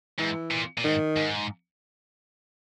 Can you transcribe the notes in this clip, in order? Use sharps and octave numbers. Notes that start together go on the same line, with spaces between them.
G#2 E3
A#2
A#2
G#2 D#3
G#2